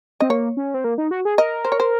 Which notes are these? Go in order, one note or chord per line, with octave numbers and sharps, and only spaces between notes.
C4 D#5
A#3 C#5
C#4
C4
A#3
D#4
F#4
G#4
A#4 D#5
C5
C#5
C5